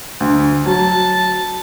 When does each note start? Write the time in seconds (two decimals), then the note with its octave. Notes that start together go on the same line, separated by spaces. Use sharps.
0.20 D2
0.66 F#3 A5